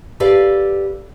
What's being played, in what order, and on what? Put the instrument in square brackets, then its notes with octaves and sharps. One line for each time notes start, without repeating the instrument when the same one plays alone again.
[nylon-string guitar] G4 A4 B4 D5 F5